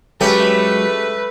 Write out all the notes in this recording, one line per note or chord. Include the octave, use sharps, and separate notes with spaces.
F#3 G#3 A3 C#4 G4 B4